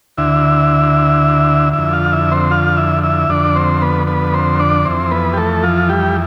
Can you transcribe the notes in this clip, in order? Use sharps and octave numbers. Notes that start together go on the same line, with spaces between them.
D2 D3 E4 E5
F2 D3 E4 E5
F4 F5
E4 E5
C4 C5
F4 F5
E4 E5
E4 E5
F2 D3 D4 D5
C4 C5
B3 B4
B3 B4
C4 C5
D4 D5
F2 E3 C4 C5
B3 B4
G4
A3 A4
F3 F4
G3 G4